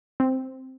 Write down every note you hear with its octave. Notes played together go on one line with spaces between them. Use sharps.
C4